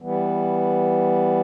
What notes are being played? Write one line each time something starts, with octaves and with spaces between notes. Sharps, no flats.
E3 G3 B3